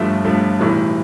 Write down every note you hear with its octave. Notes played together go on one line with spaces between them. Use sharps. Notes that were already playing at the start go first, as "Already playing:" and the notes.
Already playing: G1 G2 F3 A3 E5
G1 G2 F3 A3
B1 A2 E3 G3